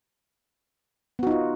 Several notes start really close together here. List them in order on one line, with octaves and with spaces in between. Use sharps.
B3 F#4 D#4 F4